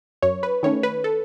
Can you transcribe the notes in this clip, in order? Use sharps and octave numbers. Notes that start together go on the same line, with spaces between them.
F#2 C#5
B4
D#3 A3 C#4 C#5
B4
A4